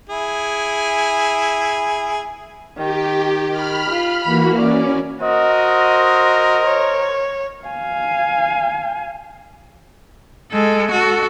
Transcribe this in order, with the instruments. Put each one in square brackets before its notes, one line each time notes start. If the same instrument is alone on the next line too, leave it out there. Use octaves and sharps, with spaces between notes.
[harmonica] E4 G#4
[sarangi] D#3 [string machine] G4
[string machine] B5 F6
[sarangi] F4
[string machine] E3 A#3 F#4 [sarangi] B5
[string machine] C#4 [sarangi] D5
[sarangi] F#4 [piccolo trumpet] A#4 [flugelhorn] C5 [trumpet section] D#5
[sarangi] C#5
[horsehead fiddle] F5 G#5
[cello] G#3 A4
F#4 A4